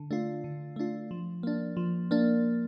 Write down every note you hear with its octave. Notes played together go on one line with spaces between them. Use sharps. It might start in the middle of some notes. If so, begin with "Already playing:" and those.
Already playing: D3
A3 D4 F4
D3
A3 D4 F4
F3
A#3 D4
F3
A#3 D4